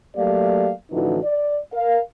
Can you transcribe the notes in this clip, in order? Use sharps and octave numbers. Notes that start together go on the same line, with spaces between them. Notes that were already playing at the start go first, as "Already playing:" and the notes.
F#3 A3 A#3 G4 D5 F5
A1 D3 E3 F3 D#4 F#4
D5
A#4 F5